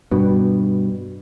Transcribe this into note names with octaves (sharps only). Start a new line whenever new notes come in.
G2 B2